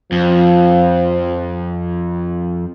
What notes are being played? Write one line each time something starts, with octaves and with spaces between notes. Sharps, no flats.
F2 F3